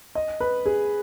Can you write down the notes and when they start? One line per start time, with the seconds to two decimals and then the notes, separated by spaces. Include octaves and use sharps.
0.15 D#5
0.40 B4
0.66 G#4